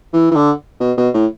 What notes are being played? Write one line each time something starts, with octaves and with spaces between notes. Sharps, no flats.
E3
E3
D3
B2
B2
A2